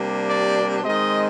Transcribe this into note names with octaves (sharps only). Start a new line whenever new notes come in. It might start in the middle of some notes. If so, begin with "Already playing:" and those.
Already playing: C3 G3 A#3 D4
D5
D#3 G#3 C4 D#5